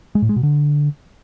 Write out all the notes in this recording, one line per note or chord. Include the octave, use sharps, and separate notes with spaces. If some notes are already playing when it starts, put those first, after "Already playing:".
G#3
A2
G#3
B2
D3